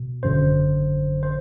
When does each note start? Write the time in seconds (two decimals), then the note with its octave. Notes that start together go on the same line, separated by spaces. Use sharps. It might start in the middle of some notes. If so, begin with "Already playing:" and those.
Already playing: B2
0.23 G#1 F#2 D3 C5
1.23 C5